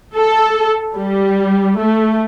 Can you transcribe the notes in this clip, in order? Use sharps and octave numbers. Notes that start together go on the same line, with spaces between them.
A4
G3
A3